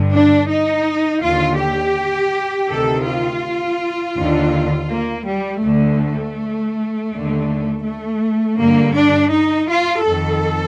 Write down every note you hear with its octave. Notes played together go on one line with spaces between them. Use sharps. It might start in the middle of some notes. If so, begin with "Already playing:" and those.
Already playing: G2 D3
D4
D#4
D#2 D3 F4
G4
D2 C3 D#3 A4
F4
D#2 D3
A#3
G3
D2 D3 A3
D#2 D3
A3
G2 D3 A#3
D4
D#4
F4
F2 D#3 A4